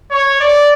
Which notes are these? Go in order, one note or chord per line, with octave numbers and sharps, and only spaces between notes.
C#5
D5